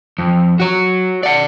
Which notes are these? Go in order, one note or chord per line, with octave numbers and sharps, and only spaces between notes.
F2
F#4 C#5
D5 F#5